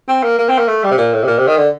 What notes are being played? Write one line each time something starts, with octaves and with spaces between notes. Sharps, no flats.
C4
A#3
A#3
C4
A#3
A3
G3
C3
A#2
A2
C3
A#2
C3
D#3
D3